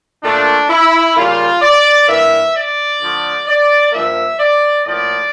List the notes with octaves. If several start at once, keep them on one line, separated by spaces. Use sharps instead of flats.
A#2 A3 D4
E4
C#3 G3 A#3 F4
D5
G2 E3 A#3 E5
D5
D3 F3 A3
D5
G2 F3 A#3 E5
D5
A2 F3 A#3 D5